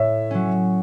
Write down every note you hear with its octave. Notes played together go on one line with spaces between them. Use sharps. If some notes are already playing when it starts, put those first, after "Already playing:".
Already playing: A2 C#5 E5
F#3 C#4